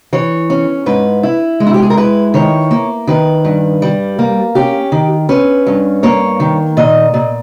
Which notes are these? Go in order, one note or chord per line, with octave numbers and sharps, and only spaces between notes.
E3 C#5
C#4
G#2 B4
E4
G#3
E4
G4
G#4
A#4
E4 B4
D#3 C#5
A#3
D#3 B4
G2
G3
A#3
C#4 G4
D#3
C#4 B4
G2
A#3 C#5
D#3
A#2 D#5
A#2